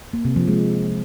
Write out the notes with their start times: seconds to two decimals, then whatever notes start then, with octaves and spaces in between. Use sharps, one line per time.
0.13 A#3
0.25 C3
0.36 F3
0.48 G#3